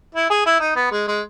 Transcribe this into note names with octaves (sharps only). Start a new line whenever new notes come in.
E4
G#4
E4
D#4
B3
G#3
G#3